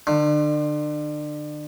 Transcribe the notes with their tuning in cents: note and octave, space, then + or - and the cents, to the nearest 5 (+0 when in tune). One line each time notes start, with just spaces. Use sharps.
D3 +35